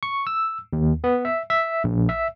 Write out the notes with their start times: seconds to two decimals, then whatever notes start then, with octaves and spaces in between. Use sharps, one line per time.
0.03 C#6
0.27 E6
0.73 D#2
1.04 B3
1.25 E5
1.50 E5
1.84 A#1
2.09 E5